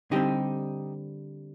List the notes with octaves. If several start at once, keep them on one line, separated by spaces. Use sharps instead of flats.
D3 G3 C4 D#4 G4